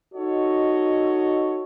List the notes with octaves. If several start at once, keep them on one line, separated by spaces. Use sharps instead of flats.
D#4 F#4 A4 C#5 D#5